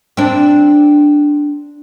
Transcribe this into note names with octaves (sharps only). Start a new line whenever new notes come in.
C4 D4